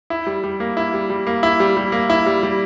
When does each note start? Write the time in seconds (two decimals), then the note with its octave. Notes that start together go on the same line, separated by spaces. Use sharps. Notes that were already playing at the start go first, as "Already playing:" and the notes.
0.10 E4
0.27 G3
0.44 G3
0.60 A#3
0.77 E4
0.94 G3
1.10 G3
1.27 A#3
1.43 E4
1.60 G3
1.77 G3
1.92 A#3
2.10 E4
2.26 G3
2.43 G3